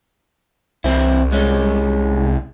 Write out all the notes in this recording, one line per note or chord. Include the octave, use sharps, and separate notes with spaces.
C2 E3 C4 E4
G#3 C#4